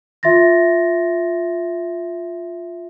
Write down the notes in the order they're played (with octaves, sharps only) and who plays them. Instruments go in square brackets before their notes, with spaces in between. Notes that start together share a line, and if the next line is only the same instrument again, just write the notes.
[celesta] F4 E5 C6 A6 A#6